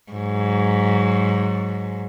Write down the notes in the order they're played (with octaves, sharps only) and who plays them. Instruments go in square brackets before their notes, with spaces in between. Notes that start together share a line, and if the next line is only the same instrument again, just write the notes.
[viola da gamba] G#2 F#3